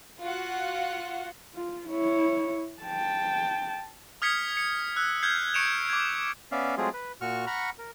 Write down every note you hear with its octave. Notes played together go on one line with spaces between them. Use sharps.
F4 F#4 F#5
F4
E4 C#5
G5 A5
D#6 F6 G#6 B6 C#7
C#7
E6 F#6
F6 G6 G#6 C7
C#6 C#7 D7 E7 F7
D6 G#6
B3 C#4 D5 E5 F5
F#3 G#3 A3 C4 F4 G#4
B4
A#2 F#4 C#6 F6
F#5 A#5 B5 C#6 F6
A#4